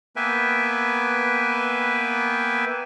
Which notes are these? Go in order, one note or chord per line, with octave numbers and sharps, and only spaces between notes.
A#3 B3 B4 E5 G5 G#5